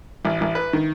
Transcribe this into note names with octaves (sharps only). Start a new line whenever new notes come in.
A1
A1
B4
D#3